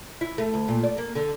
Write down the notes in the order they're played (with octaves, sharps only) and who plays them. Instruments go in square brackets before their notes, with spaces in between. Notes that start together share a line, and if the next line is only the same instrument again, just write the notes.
[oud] E4
A3
D2
A#2
D5
A#3
D3